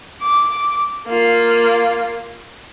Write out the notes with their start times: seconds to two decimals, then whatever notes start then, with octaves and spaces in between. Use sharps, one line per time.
0.22 D6
1.07 A#3 F4